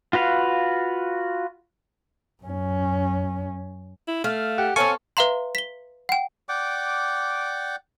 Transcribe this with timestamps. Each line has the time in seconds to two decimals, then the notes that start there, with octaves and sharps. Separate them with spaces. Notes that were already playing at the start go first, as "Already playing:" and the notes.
0.13 F4 F#4 B4 F5
2.43 F#2 C#4
4.08 E4
4.24 A3 F5
4.58 G4 F#5
4.76 C4 A4 C#5 F5 G#5 C#6
5.17 B4 E5 F5 A#5 C6
5.55 B6 G7
6.09 F#5 G5
6.49 D5 F#5 G5 D6